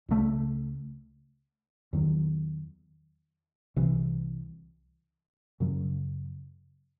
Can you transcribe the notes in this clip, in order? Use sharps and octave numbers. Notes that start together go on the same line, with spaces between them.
C#2 C#3 F#3 A3
E2 D#3 F#3
C2 C3 E3
F#2 C#3 F#3